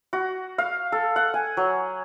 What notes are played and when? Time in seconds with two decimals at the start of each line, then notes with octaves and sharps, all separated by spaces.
0.13 F#4
0.58 F5
0.92 A4
1.16 F#5
1.34 G#5
1.57 F#3